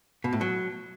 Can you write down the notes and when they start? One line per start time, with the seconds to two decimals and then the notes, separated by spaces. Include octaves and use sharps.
0.24 B2
0.33 A2
0.41 F#3